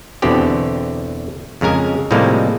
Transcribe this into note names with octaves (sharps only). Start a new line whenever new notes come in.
E2 B2 D3 C4 G4
F2 C#3 G#3 A#4 G#5
A2 C3 F3 G3 G#3 A#3